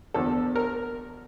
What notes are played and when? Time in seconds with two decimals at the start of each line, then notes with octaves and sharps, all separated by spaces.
0.14 E2 D3 F3 A4
0.56 A#4